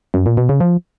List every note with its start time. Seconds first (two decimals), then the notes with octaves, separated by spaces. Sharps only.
0.14 F#2
0.26 A#2
0.37 B2
0.49 C#3
0.61 F3